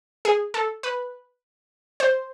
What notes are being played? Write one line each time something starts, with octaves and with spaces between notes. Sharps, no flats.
G#4
A4
B4
C5